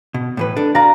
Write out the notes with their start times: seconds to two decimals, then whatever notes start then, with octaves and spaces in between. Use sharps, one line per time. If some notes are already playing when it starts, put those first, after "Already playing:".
0.14 B2
0.37 A2 E3 B4
0.56 D4 A4
0.75 F#4 D5 F5 A#5